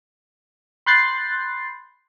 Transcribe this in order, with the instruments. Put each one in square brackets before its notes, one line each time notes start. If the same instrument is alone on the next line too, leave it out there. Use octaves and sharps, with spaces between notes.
[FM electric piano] B5 C6 F#6 G6 A6 C7